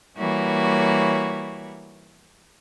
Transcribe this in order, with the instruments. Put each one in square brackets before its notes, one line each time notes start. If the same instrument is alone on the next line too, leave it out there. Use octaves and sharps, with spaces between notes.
[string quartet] E3 G3 A#3 F#4 C#5